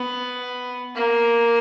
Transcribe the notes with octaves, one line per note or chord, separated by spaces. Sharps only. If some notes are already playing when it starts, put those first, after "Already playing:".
Already playing: B3
A#3